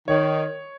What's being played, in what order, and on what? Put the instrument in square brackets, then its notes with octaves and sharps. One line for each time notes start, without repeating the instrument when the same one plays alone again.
[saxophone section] D#3 [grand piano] C#5